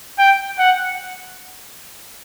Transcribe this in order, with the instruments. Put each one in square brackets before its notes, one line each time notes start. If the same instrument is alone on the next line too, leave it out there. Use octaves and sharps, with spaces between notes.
[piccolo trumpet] G5
F#5